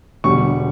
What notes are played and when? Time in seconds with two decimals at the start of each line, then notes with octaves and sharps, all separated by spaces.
0.24 E1 E2 D3 G3 C#6